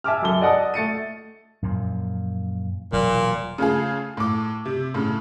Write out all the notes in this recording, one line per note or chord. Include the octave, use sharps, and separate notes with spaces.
E5 G#5 A5 D6 E6 F6
C#2 F#2 A4 G7
D5 D#5 F#5 A5 D#6
A3 A6 C#7 D#7
F#2 A#2 F3
E1 A#2 F#3 G3
C#3 A3 F4 G#4
A2 D6
C3
A2 C#3